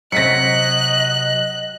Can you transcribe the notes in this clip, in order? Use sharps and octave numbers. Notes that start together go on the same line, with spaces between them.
C3 F#3 D#5 F#6 A#6 B6 C#7